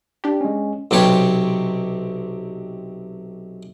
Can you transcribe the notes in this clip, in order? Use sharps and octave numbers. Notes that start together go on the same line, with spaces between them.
D4 G4
G#3 C#4
B1 C3 G4 C#5